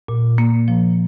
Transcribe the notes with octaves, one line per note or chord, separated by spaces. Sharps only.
A#2
A#3
F3